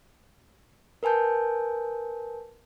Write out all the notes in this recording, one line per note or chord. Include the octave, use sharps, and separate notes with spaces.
A#4 B4 G#5 A5 G6